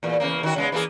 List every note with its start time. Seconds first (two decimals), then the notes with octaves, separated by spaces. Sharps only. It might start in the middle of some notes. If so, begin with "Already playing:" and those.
0.03 E2 A#2
0.20 E2 C#3 A#3
0.43 D#3 F#4
0.56 C#3 G#3 B3
0.72 E3 A#3 G#4